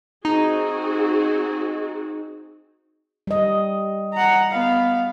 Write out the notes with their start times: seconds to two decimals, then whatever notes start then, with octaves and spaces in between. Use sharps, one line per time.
0.25 C4 D#4 F#4 G#4
3.27 G3 D#5
4.13 F#5 A#5
4.51 B3 F5